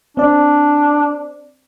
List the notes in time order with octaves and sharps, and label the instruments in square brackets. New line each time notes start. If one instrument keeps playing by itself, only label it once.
[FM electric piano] C4 D5 [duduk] D4